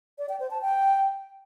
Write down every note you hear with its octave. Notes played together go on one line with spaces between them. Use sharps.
D5
G5
C5
A5
G5